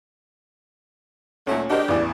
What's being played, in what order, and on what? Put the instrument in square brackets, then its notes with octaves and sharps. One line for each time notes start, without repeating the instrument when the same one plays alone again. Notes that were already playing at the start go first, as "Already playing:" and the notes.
[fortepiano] D2 A#2 [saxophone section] F#3 A3 [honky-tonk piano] C#4
[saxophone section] G#3 G4 [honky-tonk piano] D4 [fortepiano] F#4 A#4 C5 [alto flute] D#5
[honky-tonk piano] A1 E2 [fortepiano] C#3 E3 D4 [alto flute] D5